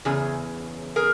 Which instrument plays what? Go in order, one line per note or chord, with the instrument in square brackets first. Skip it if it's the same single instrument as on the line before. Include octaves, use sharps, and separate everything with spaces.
[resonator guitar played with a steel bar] E2 C#3 G#4
G#4 A#4